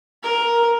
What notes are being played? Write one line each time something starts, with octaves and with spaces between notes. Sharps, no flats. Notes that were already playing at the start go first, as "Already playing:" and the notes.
A#4